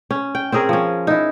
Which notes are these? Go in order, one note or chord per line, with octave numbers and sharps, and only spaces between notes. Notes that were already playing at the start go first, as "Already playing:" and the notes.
C#4
G5
C4 C#4 G#4 A#4
F3 C#4
D#4 E4